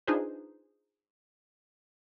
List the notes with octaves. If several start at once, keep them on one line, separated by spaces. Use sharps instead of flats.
D4 D#4 F4 G#4 B4 C5